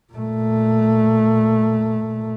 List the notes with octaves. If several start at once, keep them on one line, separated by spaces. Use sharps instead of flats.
A#2 A3